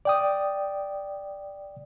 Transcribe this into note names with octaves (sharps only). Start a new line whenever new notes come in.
D5 G5 D#6